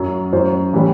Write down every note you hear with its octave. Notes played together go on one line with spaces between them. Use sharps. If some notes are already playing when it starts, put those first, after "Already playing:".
Already playing: F#2 F#3
F#2 F#3 C5
A2 E3 G3